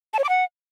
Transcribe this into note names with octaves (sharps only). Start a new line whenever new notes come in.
A5
C#5
D6
F#5